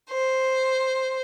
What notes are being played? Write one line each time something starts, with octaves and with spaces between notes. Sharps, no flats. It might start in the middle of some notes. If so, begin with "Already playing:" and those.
C5